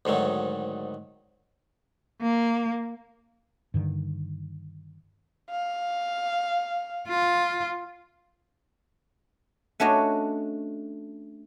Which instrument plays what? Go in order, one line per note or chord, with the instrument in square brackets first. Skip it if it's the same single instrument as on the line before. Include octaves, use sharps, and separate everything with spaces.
[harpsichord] D2 G#2 D#3 F#3
[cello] A#3
[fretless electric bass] G2 D3 D#3
[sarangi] F5
[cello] F4
[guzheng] A3 C#4 D4 F#4 C#5 D#5